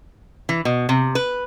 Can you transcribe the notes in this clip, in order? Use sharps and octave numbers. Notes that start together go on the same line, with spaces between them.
E3
B2
C3
B4